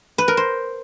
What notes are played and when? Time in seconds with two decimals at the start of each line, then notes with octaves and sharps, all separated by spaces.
0.18 B4
0.28 A#4
0.37 C5